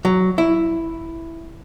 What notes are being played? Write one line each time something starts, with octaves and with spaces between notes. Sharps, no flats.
F#3
E4